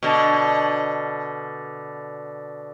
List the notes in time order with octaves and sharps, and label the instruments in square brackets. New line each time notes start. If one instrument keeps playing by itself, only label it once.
[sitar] B2 D3